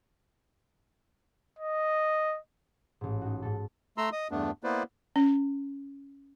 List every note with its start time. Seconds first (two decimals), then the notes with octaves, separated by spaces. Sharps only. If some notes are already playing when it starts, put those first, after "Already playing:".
1.59 D#5
3.01 A1 G#2
3.21 D#4 F#4
3.42 G#2 A4
3.98 A3 A#5 C6 E6
4.13 D#5 D#6
4.31 E2 G2 A3 B3 D4
4.64 A#3 B3 E4 B4 C5 D5
5.16 C#4